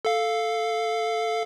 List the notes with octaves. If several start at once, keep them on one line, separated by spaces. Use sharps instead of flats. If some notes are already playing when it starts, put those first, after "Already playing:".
A4 F5